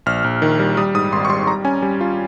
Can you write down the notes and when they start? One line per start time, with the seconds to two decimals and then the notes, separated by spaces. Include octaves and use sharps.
0.06 A#1 F6
0.24 A#1
0.42 D#3
0.59 G3
0.77 G3 D#6
0.94 G#2 D#6
1.12 G#1 C6
1.25 C#6
1.29 G3 C6
1.47 G3 A#5
1.65 C#4 G#5
1.82 G3
2.01 F4